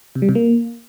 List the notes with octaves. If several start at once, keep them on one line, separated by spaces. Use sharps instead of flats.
C3
G3
C3
A#3